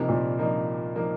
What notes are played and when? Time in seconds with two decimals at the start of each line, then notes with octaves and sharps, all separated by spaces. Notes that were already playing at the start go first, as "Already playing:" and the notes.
Already playing: G2 C3 F3 A#3 D#4
0.09 A#2
0.38 G2 F3 A#3 D#4
0.95 F3 A#3 D#4